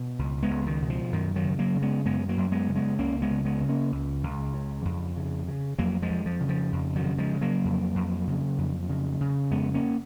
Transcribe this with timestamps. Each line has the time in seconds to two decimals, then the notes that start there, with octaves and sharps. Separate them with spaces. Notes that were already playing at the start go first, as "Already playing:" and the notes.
Already playing: B2
0.19 C#2
0.43 G#3 B3
0.50 C#2
0.66 D#3
0.82 B2
0.90 F3
1.12 F#2 D#3
1.36 D#3 F#3
1.44 C#3
1.59 F#3 A#3
1.75 C#3
1.82 G#3 B3
2.05 F#2 G#3 B3
2.29 F#3 A#3
2.37 F#2
2.52 G#3 B3
2.68 C#3
2.76 G#3 B3
2.99 C#2 A#3 C#4
3.22 G#3 B3
3.31 C#3
3.45 G#3 B3
3.61 C#3
3.69 A#3 C#4
3.92 C#2
4.23 C#2
4.54 C#3
4.85 F2
5.17 C#3
5.48 C#3
5.78 F2 F#3 A#3
6.02 F3 G#3
6.10 F2
6.26 F3
6.40 C#3
6.49 F3
6.72 F2
6.96 D#3 F#3
7.03 C#3
7.18 F3 G#3
7.33 C#3
7.41 F#3 A#3
7.65 F2
7.95 F2
8.27 C#3
8.58 F2
8.89 C#3
9.21 C#3
9.51 F2 G#3 B3
9.74 A#3 C#4